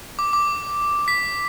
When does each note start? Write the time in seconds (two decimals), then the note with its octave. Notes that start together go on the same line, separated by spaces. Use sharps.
0.19 D6
0.33 D6
1.08 B6